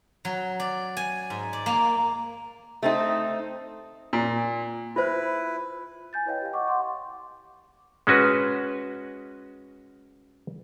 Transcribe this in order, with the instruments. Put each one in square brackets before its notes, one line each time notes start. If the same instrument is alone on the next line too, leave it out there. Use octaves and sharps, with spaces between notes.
[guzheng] F#3
D5
G#5
G#2
D5
A#3
[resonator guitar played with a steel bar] A3 C4 D#4
[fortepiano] A#2
[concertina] E4 B4 [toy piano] F4 C5
[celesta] G#5 G6 A6
E4 B4 C#5 D#5 F5 G5
G4 F5
D#5 F#5 C#6 D6
F5 F#5 C6 D6
[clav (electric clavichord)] G#3 C#4 F#4 B4